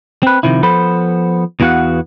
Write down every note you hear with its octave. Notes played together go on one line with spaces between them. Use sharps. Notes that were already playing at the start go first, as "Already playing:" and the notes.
C4 B4
C3 D#3 F3 E4
F3 B3 A4 C5 B5
E2 E3 B3 F#4 F5 F#5